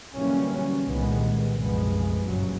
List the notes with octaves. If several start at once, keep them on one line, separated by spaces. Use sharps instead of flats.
D3 E3 F#3 G3 A#3 C#4
C2 A#2 D#3 G3 G#3 B3
C2 F#2 B2 F3 G#3 B3
F#1 G2 A#2 C#3 F#3